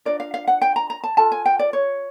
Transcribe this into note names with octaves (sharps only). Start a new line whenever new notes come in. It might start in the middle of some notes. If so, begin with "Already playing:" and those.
D4 F4 A#4 D5
F5
F5
F#5
G5
A#5
A#5
A5
F4 A4 A5
G#5
G5
D5
C#5